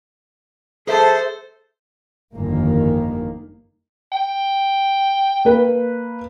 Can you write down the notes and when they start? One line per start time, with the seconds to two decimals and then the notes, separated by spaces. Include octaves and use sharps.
0.87 G#4 A4 C5 E5 A5
2.34 G1 F2 D#3 A#3
4.12 G5
5.45 A#3 B4